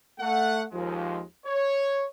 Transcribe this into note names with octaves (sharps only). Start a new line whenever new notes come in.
A3 F#5
D#2 F3 G#3
C#5